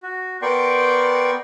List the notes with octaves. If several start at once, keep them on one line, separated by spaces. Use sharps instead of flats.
F#4
B3 A#4 D5 G5 C6 C#6